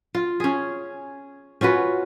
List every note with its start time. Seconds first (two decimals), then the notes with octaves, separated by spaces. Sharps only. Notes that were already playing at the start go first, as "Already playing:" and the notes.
0.15 F4
0.40 C#4 G#4
1.61 C#4 F4 F#4 B4